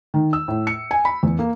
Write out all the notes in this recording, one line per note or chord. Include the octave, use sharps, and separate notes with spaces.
D#3
E6
A2
C#7
G#5
B5
E2
A#3